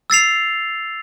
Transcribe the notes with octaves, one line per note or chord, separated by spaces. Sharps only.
E6 A6 C7 F7